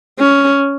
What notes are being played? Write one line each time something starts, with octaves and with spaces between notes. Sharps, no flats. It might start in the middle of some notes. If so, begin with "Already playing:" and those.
C#4